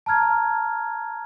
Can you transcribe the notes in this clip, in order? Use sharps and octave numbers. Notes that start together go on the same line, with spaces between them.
A5 A#5 F6 G#6